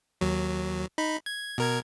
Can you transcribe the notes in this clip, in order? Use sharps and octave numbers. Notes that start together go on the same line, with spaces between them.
D#2 F#3
D#4 B5
G#6
B2 A#4 G#6